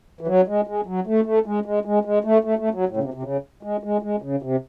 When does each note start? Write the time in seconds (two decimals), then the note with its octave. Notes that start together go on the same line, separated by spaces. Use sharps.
0.21 E3
0.27 F#3
0.47 G#3
0.67 G#3
0.86 F#3
1.07 A3
1.25 A3
1.46 G#3
1.66 G#3
1.85 G#3
2.05 G#3
2.24 A3
2.44 A3
2.59 A3
2.74 F#3
2.89 A2
2.97 C#3
3.03 C3
3.14 C3
3.23 C#3
3.63 G#3
3.83 G#3
4.02 G#3
4.22 C#3
4.42 C3